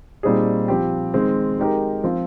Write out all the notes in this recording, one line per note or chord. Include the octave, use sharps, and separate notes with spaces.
A#2 G3 C4 D#4 G#4
F3 C4 G4
D#3 G#3 C4
G#3 D#4 G4 A#4
F3 C4 F4